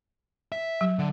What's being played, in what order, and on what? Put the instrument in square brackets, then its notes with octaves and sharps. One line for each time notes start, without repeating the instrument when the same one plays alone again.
[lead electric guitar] E5
[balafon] F#3
[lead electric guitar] D3